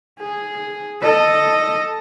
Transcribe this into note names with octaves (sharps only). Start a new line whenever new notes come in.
G#4
A4 D#5